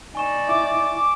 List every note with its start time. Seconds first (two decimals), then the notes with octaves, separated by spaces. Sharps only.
0.15 D#4 D5 G#5 C#6 E7
0.48 E4 E5 D6